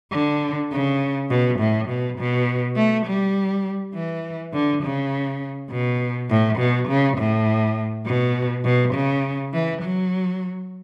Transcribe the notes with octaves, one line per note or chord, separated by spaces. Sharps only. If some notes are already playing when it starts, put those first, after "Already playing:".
D3
C#3
B2
A2
B2
B2
A3
G3
E3
D3
C#3
B2
A2
B2
C#3
A2
B2
B2
C#3
E3
F#3